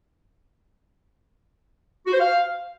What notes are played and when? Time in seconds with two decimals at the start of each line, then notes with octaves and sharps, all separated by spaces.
2.07 F#4
2.13 C5
2.20 F5